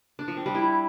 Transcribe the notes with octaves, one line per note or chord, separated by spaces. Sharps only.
D4
F3
C4
G3
E4